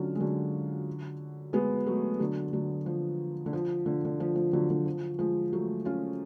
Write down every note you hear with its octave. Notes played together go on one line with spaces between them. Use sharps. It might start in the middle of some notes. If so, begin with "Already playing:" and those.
Already playing: D3 F#3 C#4 F4
G#3
D3 F#3
G#3 B3
F#3 A3
D3 F#3
D3 F#3
F3
D3
F3
D3
D3
F3
F3
D3 F#3
D3
F3
F3 G#3
F#3 A3
C#4 F4